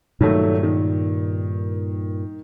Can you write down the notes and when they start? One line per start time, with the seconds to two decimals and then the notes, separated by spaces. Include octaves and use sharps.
0.21 G2 A#2 D#3 F#3 A3
0.63 D#3